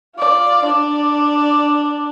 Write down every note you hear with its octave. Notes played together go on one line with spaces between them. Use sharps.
F4 D5
D4 D5